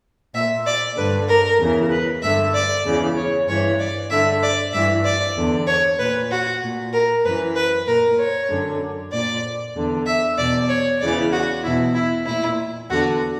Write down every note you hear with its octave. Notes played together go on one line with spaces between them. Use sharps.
A#2 E5
D5
G2 D3 B4
A#4
E2 C#3 E3
B4
G2 D3 E5
D5
E2 C#3 E3
C#5
G2 E3 C#5
D5
G2 D3 E5
D5
G2 E3 E5
D5
E2 D3
C#5
A#2 B4
F#4
A#2
A#4
F#2 E3 B4
B4
A#2 A#4
C#5
F#2 D3
A#2 D5
E2 D3
E5
E2 B2 D5
C#5
E2 C#3 E3 D5
F#4
E2 B2 E4
E4
A#2 E4
E2 D3 F#4